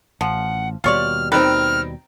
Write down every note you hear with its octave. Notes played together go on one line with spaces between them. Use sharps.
A1 F3 F#5
D#2 B2 G3 F4 C#5 D5 F6
D#3 C4 B4 F6